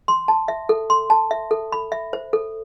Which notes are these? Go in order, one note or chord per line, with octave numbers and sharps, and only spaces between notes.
C6
A5
E5
A4
C6
A5
E5
A4
B5
E5
C5
A4